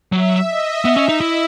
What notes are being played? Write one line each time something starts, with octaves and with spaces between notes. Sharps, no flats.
F#3 E5
D#5
B3 E5
C#4
D#4
E4